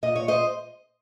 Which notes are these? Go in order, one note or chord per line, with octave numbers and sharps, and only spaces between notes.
A#2 D#5
C#5
C5 D#5